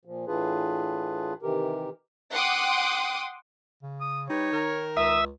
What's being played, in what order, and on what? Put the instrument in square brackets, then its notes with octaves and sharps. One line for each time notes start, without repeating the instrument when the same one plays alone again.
[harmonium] A#2 F3
A2 E3 D4 F4 G#4 B4
C3 D#3 E3 G4 A#4
[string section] F#5 G5 C6 D6 D#6
[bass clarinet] C#3
[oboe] D#6
[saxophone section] G3 B4 [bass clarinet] D#4 [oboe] C#5
[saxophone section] D#3 A#4
[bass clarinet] C#2 [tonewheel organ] E5 [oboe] D#6